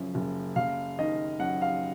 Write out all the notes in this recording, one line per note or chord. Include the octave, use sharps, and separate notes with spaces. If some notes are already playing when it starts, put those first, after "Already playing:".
Already playing: F#1 F#2 F3
F#1
F#1 F5
D#3 D#5
F#2 F#5
F5